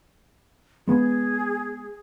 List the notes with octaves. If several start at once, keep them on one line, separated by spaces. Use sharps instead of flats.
G#3 B3 G#4